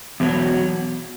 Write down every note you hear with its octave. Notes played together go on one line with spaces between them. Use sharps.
E2 B2 F#3